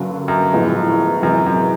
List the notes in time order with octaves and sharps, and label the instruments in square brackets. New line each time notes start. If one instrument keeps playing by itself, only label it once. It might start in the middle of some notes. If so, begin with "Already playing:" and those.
Already playing: [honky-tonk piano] G2 D3 F#3 A#3 C#4
[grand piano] F#2
[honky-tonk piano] A#1 A2 F3 G#3 B3
[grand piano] F#2 [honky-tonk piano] C3 E3 G#3 C#4
[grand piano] F#2